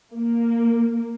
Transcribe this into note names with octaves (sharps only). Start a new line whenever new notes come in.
A#3